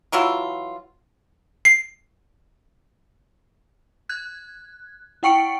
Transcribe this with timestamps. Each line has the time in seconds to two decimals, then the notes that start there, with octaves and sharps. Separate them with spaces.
0.12 E3 F#3 E4 F4
1.65 C7
4.09 F#6 G#6
5.23 E4 F#5 G5 C#6 C#7 D7